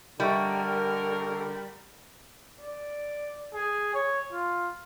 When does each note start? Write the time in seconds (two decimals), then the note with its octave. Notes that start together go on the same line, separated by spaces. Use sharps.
0.20 D3 G3 A#4 D#5 E5 C#6
2.61 D5
3.54 G#4
3.94 C#5
4.33 F4